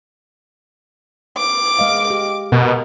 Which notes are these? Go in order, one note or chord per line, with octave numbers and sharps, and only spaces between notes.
D6
G#3 D#5 F5
G4
B2 A#4